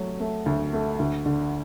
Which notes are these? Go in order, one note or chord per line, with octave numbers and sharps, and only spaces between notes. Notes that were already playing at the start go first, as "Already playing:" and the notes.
Already playing: F#3 A3
A3
D2
A3
D2
D3